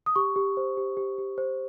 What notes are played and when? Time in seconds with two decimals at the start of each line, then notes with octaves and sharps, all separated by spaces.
0.06 D#6
0.16 G4 C#6
0.36 G4
0.57 C5
0.77 G4
0.97 G4
1.18 G4
1.38 C5